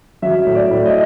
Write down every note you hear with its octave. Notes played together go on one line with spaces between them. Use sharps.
F#3 E5
A2
D5
A2
D#5